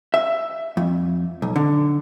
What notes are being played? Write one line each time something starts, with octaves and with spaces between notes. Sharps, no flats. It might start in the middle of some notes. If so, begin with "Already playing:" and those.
E5
F2
B1
D3